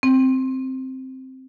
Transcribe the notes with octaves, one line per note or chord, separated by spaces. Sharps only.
C4